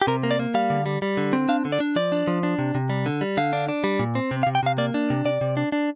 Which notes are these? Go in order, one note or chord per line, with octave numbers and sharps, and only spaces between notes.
G4
C3 A#4
A#3
D5
A#3
G3 F5
D3
G3
G3
D3
C4
D4 F5
D3
D5
D4
F3 D5
D4
F3
D4
C3
C3
G3
D3
G3
D3 F5
D4
D4
G3
A#2
C4
C3
F5
C3
G5
C3 F5
A#3 D5
D4
C3
C3 D5
C3
D4
D4